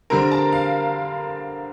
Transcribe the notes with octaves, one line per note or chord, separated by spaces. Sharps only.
D3 G3 C4 A#4
A5
F5